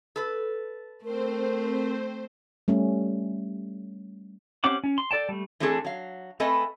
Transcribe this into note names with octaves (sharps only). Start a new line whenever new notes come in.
A4 B4
A3 C4 A#4 C5
G3 A3 C#4
C4 C#4 G4 F#5 D6
C#4
C6
A4 D5 G5 A5
G3 A3
E3 A3 C4 D4 G#4 A4
F#3 F5
A3 C4 A4 B4 D#5 G#5